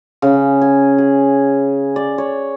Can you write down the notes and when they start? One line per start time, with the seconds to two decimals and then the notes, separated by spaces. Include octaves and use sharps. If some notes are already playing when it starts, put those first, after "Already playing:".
0.22 C#3
0.62 G#5
0.98 G#4
1.96 D5
2.18 C#5